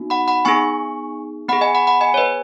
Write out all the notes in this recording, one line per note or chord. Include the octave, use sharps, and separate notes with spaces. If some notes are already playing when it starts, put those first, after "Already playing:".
Already playing: B3 D#4 F#4
F#5 B5
F#5 B5
B3 D#4 G#4 G#5 C#6
B3 G#4 F#5 B5
D#5 G#5
F#5 B5
F#5 B5
D#5 G#5
C#5
B4 D#5